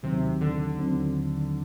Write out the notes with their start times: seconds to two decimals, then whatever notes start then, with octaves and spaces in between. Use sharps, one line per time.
0.03 D#2 C3 D#3 F#3 C4
0.41 D3
0.78 D#2 D#3 F#3 C4